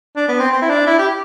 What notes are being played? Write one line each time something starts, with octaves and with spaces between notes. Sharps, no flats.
D4
B3
C4
C4
E4
D4
E4
G4